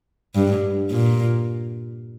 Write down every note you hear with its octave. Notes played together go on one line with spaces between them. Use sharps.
G2
A#2